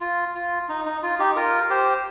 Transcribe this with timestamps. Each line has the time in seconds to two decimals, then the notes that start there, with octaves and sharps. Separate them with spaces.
0.01 F4
0.35 F4
0.69 D#4
0.85 D#4
1.03 F4
1.19 D#4 G4
1.36 F4 A#4
1.70 G4 C5